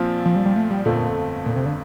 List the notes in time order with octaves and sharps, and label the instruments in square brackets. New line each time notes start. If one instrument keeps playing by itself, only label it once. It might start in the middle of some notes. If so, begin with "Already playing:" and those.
Already playing: [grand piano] A#1 A#2 F3 C4 F4
[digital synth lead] F3
G3
G3
A3
G3
[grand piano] G1 F2 D3 A3 C4 [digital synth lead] A#2
[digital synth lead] A#2
C3
D3